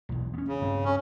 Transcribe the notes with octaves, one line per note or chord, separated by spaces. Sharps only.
B1 E2
B3 C#4
C#3
G2 C4
C#4